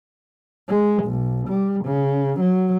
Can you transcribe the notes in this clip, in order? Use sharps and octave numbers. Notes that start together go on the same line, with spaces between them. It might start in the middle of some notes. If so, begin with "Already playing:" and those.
G#3
B1
G3
C#3
F#3